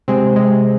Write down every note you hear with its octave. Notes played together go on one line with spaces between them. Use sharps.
C3 G#3 C4
C3 G#3